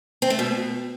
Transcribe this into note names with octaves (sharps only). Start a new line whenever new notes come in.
C4
A3
B2